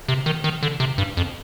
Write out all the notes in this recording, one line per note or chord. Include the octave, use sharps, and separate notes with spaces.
C3
D#3
D#3
D3
C3
G2
F2